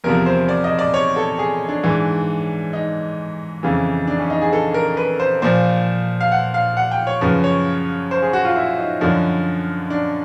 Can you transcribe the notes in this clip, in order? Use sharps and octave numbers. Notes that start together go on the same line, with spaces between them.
E2 C3 F3 A#4
C5
D5
D#5
D5
C#5
A4
G#4
D4
G#2 E3
D#4
F2 C#3 E3
D4
C#4
D#4
G#4
A4
A#4
B4
C5
A#2 F3 C5
F5
F#5
F5
F#5
G5
C#5
F#2 C#3 F3 B4
C#5
C5
G#4
F#4
F4
E4
D#4
F#2 D3 F3
D4